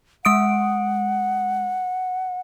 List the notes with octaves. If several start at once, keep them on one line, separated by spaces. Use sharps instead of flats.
G#3 F#5 D#6 D7